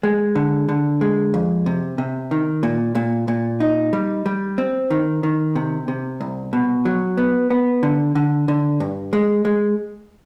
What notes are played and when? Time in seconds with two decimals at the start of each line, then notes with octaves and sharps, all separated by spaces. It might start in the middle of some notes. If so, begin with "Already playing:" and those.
0.03 G#3
0.35 D3
0.68 D3
1.01 G#3
1.34 F2
1.66 C3
1.98 C3
2.31 D#3
2.63 A#2
2.95 A#2
3.28 A#2
3.60 D#4
3.93 G3
4.26 G3
4.58 C4
4.90 D#3
5.23 D#3
5.55 C3
5.88 C3
6.21 C2
6.53 B2
6.85 F#3
7.17 B3
7.50 B3
7.83 D3
8.15 D3
8.48 D3
8.80 G2
9.13 G#3
9.45 G#3